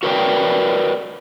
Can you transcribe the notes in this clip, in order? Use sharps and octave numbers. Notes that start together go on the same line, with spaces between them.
F#4 A#4 B4 C#5 D5 G5